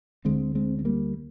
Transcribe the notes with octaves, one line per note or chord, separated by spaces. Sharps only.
D2 D3 G#3 C4
G#3 C4
C4
G3 A#3